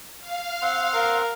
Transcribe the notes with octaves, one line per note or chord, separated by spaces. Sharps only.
F5
C4 F#5 C6
A#4